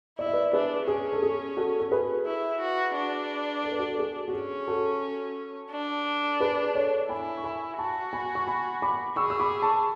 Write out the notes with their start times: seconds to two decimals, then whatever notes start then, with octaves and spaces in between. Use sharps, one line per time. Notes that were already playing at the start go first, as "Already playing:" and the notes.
0.19 E4 D5
0.26 E5
0.33 B4 D5
0.53 D4 G#4 B4
0.87 C#4 G#4
1.13 A4
1.22 G#4
1.57 F#4 A4
1.80 A4
1.91 G#4 B4
2.26 E4
2.60 F#4
2.95 D4
3.64 A4
3.72 B4
3.79 F#4 A4
3.90 A4
3.99 G#4
4.28 F#4
4.33 C#4 G#4
4.67 F#4 A4
5.71 D4
6.40 G#4 B4
6.75 A4 C#5
7.09 E4 G#5 B5
7.37 C#6
7.44 G#5 B5
7.78 F#4 A5 C#6
8.13 G#5 B5
8.35 C#6
8.47 G#5 B5
8.82 B5 D6
9.16 G#4 C#6 E6
9.30 E6
9.40 B5 D6
9.62 A5 C#6